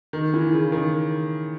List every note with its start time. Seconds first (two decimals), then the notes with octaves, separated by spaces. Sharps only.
0.13 D#3
0.34 E3
0.52 C#3
0.72 D#3